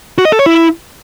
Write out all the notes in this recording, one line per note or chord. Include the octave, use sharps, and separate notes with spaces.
F#4
D#5
A4
C#5
E4